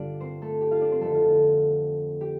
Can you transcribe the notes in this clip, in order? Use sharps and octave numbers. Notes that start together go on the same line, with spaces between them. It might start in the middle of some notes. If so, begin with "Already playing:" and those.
Already playing: G2 D3 D4 F4 G4 D5 F5
C4 C5
A3 A4
G4
F4 F5
D4 D5
C4 C5
F2 D3 A3 A4
F4
F4
G4